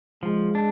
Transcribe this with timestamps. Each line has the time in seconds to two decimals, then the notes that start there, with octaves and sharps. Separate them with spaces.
0.23 F3 G#3
0.55 D4